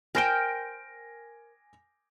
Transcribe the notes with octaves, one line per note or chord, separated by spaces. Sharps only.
A#4 C5 G5 G#5 A#6 D7